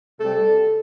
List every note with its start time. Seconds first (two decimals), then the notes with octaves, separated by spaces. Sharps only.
0.19 C3 G3 A4